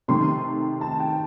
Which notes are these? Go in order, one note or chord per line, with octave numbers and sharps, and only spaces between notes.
C3 D#3 A3 C6
A5
G5